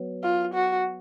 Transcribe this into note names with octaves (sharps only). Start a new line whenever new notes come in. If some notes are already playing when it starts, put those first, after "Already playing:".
Already playing: F#3 B3
F4
F#4